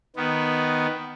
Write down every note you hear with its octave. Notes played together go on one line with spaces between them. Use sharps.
D#3 B3